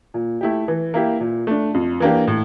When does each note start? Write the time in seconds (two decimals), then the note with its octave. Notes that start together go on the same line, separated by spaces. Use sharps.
0.14 A#2
0.41 A3 E4 G4
0.68 E3
0.94 A#3 E4 G4
1.20 A#2
1.47 A3 D4
1.74 F2
2.00 E3 A#3 D4 G4
2.28 A2